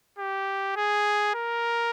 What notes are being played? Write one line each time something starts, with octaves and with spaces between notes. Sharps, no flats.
G4
G#4
A#4